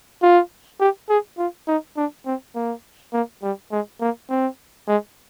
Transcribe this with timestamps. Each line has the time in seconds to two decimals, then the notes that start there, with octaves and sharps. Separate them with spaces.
0.22 F4
0.80 G4
1.09 G#4
1.38 F4
1.68 D#4
1.97 D4
2.26 C4
2.55 A#3
3.13 A#3
3.43 G3
3.72 G#3
4.01 A#3
4.30 C4
4.88 G#3